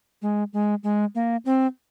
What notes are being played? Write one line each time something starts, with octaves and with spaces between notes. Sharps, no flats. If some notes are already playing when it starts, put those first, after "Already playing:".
G#3
G#3
G#3
A#3
C4